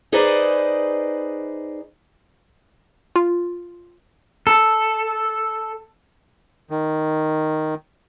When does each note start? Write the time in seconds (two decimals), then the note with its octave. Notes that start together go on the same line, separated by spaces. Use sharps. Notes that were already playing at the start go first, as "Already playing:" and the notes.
0.12 D#4 G#4 B4 C5 D5 D#5
3.16 F4
4.47 A4
6.70 D#3